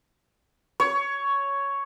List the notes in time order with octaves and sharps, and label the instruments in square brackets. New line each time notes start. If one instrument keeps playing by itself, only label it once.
[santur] C#5